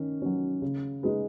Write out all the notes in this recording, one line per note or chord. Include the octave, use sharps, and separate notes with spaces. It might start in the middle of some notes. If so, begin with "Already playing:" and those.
Already playing: D#3 C#4
F#3 C#4
C#3
G#3 D#4 G#4 B4